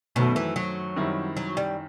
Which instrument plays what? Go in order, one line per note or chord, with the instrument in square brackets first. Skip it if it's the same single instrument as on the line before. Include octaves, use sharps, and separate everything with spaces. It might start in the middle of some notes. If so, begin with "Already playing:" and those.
[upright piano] F#2 D#3 F#3 A3 [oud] B2
[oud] E3
F#3
[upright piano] F#2 D#3 G3 C4 E4
[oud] F#3
G3